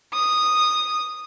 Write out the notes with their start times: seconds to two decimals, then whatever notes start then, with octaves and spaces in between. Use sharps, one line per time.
0.14 D#6